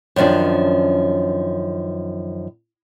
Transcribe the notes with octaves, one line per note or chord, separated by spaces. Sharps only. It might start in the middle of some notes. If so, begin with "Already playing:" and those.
F#2 D#3 F3 C#4 D4